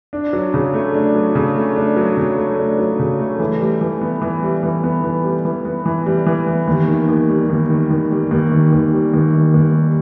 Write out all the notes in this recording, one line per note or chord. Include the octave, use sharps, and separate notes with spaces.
D4
F#3
C#3
A3
D4
F#3
C#3
A3
D4
F#3
C#3
A3
D4
F#3
C#3
A3
E3
G3
E3
B3
E3
G3
E3
B3
E3
G3
E3
B3
E3
G3
E3
B3
D#2
D#3
D#2
G3
D#2
D#3
D#2
G3
D#2
D#3
D#2
G3
D#2
D#3
D#2
G3